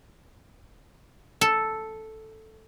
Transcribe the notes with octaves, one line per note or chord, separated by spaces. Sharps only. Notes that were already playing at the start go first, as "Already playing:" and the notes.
A4